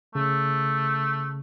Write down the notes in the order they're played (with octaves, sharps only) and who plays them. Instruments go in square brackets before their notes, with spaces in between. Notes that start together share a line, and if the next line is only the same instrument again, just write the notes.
[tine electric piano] C#3 [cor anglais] A3